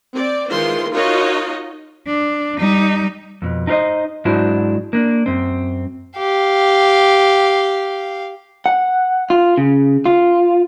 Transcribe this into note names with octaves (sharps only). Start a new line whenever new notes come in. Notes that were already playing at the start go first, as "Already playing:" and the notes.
C4 D5
D#3 E3 G#3 F4 C5 C6
D#4 F4 F#4 A#4 C#5 D#5
D4
G3 D#4
F2 B2
D#4 E4 A#4 C5 D#5
G#2 F#3 D4 E4 F#4 C5
A#3 D4
F#2 C4
G4 F5
F#5
F4
C#3
F4